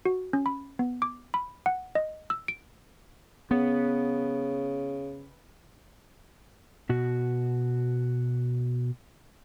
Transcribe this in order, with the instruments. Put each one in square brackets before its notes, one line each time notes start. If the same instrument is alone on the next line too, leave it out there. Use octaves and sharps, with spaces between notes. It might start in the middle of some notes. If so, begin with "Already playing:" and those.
[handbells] F#4
C#4
B5
B3
D6
B5
F#5
D#5
E6
D7
[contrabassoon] C#3 [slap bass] B3
[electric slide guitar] B2 F#4